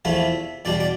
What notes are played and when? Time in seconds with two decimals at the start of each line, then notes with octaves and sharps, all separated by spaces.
0.05 E2 C3 F3 A3 E4 E5
0.65 E2 B2 G3 D4 D5
0.80 D5